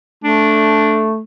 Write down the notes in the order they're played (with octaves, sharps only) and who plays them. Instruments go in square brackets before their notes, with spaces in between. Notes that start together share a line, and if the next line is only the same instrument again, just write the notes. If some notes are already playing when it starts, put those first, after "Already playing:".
[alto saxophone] A3 [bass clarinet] D4